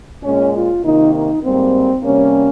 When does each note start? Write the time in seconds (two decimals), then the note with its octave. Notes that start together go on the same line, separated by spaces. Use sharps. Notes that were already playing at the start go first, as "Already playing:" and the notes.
0.24 A#2 G#3 C#4
0.54 F4
0.83 C3 D#3 A#3 D#4
1.13 D#4
1.43 G#2 G3 A#3 C4
2.03 C3 G3 A#3 C#4